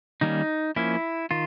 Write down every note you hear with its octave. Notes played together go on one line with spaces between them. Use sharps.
D#3 G3 A#3 C#4 D#4
F3 A#3 C#4 E4
D#3 F4